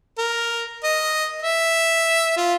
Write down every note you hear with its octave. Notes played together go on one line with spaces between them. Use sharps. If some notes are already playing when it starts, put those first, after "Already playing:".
A#4
D#5
E5
F4